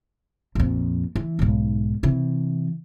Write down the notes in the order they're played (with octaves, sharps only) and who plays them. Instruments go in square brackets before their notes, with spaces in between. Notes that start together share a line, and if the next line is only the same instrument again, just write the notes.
[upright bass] A#1 F2
E3
B1 G#2
C3 E3